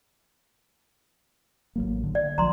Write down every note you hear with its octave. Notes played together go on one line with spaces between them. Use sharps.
A1 F#3 A#3
D3
D5
A#1 F3 F#3 A#5 C6